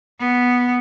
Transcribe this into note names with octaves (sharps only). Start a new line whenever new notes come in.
B3